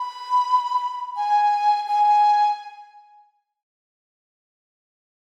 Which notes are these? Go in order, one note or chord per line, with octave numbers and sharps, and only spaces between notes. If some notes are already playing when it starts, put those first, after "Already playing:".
Already playing: B5
G#5
G#5